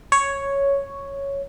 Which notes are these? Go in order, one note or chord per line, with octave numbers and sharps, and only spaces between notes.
C#5